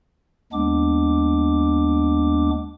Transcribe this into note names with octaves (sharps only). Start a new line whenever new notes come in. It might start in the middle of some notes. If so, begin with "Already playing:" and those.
D#2 G#3 B3 D4 D6